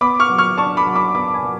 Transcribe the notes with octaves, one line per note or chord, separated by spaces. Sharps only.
B3 B5 D6
C#6 F6
F#3
C#6 F6
D4 A5 C#6
B5 D6
F#3
B5 D6
B3 B5 D6
G#5 B5
F#3